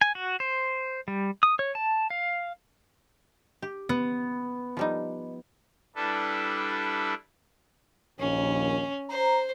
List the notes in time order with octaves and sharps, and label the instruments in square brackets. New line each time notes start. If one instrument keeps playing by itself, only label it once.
[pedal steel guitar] G#5
F#4
C5
G3
D#6
C#5
A5
F5
[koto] G4
[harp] B3
[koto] F3 G3 D#4
[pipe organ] G3 D4 E4 A4 B4
[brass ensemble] A#1 D#2 [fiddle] C#4
[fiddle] C5 [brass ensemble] A#5